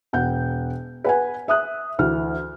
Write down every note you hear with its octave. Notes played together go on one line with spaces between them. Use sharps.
E1 F#5 G6
B4 F#5 G#5
E5 D#6 F#6
D2 E3 F6